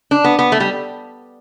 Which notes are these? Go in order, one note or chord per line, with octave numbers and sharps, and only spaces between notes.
D4
B3
B3
A3
G3